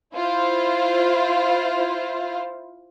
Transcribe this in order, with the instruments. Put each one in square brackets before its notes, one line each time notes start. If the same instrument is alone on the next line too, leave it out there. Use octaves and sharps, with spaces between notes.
[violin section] E4 F4 C5